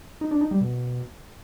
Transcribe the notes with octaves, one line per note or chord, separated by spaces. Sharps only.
D#4
D4
D#4
G3
B2